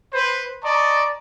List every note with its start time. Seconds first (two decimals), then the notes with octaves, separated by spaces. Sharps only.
0.13 B4 C5
0.63 D5 D#5 A5 A#5 C#6